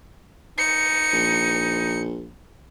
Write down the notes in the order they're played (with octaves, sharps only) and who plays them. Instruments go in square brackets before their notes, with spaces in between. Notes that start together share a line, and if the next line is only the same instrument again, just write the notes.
[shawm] D#4 [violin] C#7
[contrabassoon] A#1